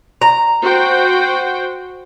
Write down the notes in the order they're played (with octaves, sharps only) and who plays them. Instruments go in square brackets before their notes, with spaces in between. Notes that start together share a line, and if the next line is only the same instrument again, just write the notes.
[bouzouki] A#5
[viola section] F#4 C5 G5